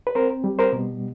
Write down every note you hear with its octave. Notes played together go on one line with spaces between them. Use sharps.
B4
C4 A#4 C5
G3
A#4 C5
B2